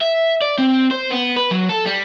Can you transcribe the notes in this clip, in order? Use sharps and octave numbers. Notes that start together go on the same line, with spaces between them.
E5
D5
C4
C5
B3
B4
F#3
A4
G3